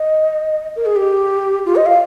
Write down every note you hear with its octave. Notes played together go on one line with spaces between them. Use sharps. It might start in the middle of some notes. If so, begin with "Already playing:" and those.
Already playing: D#5
A#4
G#4
G4
F4
D#5
F5